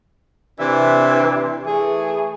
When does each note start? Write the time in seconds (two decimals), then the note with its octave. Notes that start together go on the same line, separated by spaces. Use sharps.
0.60 C3 E3 D4 E5
1.67 E3 A3 G#4